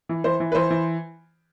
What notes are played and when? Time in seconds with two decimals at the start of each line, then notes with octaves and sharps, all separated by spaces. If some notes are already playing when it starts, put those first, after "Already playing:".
0.09 E3
0.24 E3 C5
0.40 E3
0.52 B4
0.55 E3 C5
0.70 E3